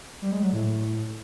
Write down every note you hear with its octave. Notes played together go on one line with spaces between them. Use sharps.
G3
G#3
F#3
A2